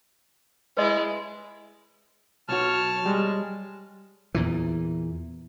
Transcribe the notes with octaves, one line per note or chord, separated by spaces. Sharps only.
G#3 E4 B4 D#5
B1 F#4 C#5 A5 F6
G3 G#3
E2 A#2 E3